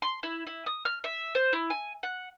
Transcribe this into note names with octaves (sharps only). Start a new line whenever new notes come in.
C6
E4
E4
D#6
F6
E5
C5
E4
G#5
F#5